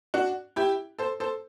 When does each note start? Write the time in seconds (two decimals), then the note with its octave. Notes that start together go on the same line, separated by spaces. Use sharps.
0.14 D4 F#4
0.56 E4 G4
0.99 A4 C5
1.20 A4 C5